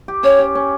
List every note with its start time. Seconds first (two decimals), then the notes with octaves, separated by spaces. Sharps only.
0.08 G4
0.23 C#4 C#5
0.39 G4
0.55 C#4